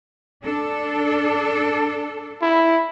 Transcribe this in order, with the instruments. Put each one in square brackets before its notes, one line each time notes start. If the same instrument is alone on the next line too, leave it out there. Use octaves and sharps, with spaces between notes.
[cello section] D4 A4
[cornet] E4